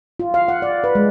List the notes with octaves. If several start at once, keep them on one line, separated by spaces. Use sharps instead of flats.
F4
F5
F#5
D5
B4
G#3